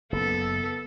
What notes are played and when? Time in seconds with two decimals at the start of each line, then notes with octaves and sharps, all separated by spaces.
0.12 F#1 B3 A4